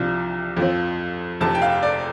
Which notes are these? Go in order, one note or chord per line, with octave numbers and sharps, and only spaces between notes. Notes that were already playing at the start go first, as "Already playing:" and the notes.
Already playing: C2 C3 F3 D4
F2 F3 C4
F1 F2 C3 A5
G5
F5
D5